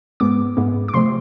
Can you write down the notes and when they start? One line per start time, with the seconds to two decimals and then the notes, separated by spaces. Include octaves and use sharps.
0.20 G#2 G#3 B3 D6
0.57 G#2 G#3 B3
0.88 D6
0.94 C3 F3 A3 C4 C6